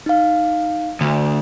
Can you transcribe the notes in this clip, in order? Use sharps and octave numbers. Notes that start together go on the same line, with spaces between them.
D#4 F5
D2